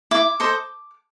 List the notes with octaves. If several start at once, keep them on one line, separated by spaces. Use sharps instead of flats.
E4 D6
A4 C5 D#5